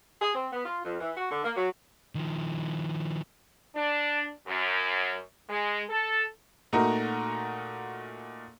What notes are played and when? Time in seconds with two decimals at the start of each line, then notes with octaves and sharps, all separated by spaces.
0.22 G#4
0.35 C4
0.53 B3
0.65 F4
0.84 F2
1.00 E3
1.17 F#4
1.31 D3
1.44 A#3
1.55 F#3
2.15 D#3 F3
3.76 D4
4.47 F#2
5.49 G#3
5.90 A4
6.73 A#2 A3 D#4 F#4 A#4